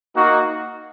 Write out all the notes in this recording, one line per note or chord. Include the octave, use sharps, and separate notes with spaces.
A#3 D#4 F#4